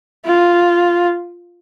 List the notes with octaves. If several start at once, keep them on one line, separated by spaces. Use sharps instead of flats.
F4